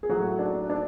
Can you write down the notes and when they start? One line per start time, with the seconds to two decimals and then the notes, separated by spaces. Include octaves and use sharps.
0.03 G#4
0.09 A2 F#3 A3 F#4
0.39 D4
0.70 D4